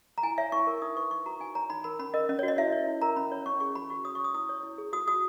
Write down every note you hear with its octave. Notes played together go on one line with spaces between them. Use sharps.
A#5
E4 G#5
C#5 E5
E4 C#6
A#4
D#4 D#6
B4 C#6
D#4 C#6
F#4 A#5
D#4 G#5
C#5 A#5
D#4 B5
A#4 B5
C#4 B5
A#4 D#5
C#4 D#5
C#5
F#4
D#5
E4 E5
C#5
E4
A#4 A#5
C#4 B5
C#5
C#4 C#6
G#4 C#6
F#4 B5
F#4 C#6
C#5 D#6
C#6
C#5 D#6
E4 D#6
C#5
E4
G#4
F#4 D#6
F#4 D#6